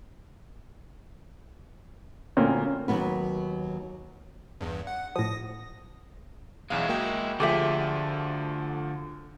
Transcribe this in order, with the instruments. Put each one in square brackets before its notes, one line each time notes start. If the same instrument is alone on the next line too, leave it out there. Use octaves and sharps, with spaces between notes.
[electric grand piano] D2 A#2 C#4 [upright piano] A#3 C4
[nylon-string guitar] D#2 F#3 B3 B4
[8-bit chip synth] E2 G2
F#5
[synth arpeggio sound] A2 F3 [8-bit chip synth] D#6 A#6
[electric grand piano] B1 E2 F5 [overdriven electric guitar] G#3 E4
[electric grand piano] A#3 F#4 G5
[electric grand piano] D2 F3 [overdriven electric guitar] D3 [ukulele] G4 G#4 E5